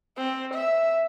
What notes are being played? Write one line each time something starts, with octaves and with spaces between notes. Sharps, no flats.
C4
E5